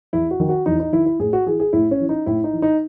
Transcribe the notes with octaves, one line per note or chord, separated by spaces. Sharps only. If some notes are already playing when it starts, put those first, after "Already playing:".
E2 E4
F#4
D#3
F#4
E2 D#4
D#4
D#3 E4
E4
A2 G#4
F#4
E3 G#4
G#4
A2 E4
C#4
E3
D#4
A2 E4
D#4
E3
D#4